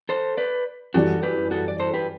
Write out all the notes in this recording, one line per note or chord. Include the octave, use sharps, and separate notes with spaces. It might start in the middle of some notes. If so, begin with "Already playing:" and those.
A4 C5
B4 D5
F#2 E3 G3 F#4 A4
G4 B4
F#4 A4
D5
A4 C5
G4 B4